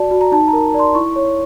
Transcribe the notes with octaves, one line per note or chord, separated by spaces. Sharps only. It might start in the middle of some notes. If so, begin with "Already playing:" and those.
Already playing: F#4 D5 A5
F#4
A#5
D#4 A5
A#5
A#4
D5 C6
E4 C#6
C#5